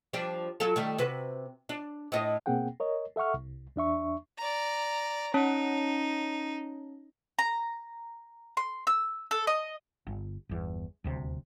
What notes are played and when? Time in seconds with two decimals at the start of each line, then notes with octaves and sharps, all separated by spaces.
0.13 F3 G3 D4
0.60 F#3 F4 A4
0.76 D#3 G3 A3
0.98 C3 F#4 B4
1.69 D4
2.12 A2 A4 D#5
2.46 B2 A#3 C4 G#4 F#5 G5
2.80 A#4 C#5 D#5
3.16 A4 E5 F#5 C#6 F6
3.34 C2
3.76 E2 D4 E5 C#6
4.38 D5 A#5
5.34 C#4 D#4 C#5 A5
7.39 A#5
8.57 C6
8.87 E6
9.31 A4
9.47 D#5
10.07 G1
10.49 G1 E2
11.04 D#1 D2 C3